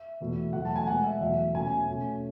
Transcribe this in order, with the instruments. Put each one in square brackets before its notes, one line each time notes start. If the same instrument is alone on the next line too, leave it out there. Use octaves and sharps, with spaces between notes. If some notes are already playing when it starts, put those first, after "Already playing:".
Already playing: [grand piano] E5
E2 B2 A3
E2 B2 F#3 A3 F#5
A5
G#5
B2 G#3 B3 F#5
E5
E2 B2 F#3 A3 E5
B2 A3 C#4 G#5
B2 A3 C#4